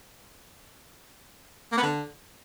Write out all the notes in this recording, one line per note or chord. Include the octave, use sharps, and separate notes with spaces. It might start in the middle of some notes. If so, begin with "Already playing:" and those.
A#3
B3
D3